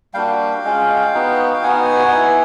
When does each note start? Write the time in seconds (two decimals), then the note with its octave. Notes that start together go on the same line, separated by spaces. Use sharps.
0.14 G3 A#3 D4 F#4 F5 G5
0.64 G#3 C#4 F4
1.14 B3 D#4 F#4
1.53 G5
1.63 B3 D#4 F#4 F#5 G#5
2.12 B3 E4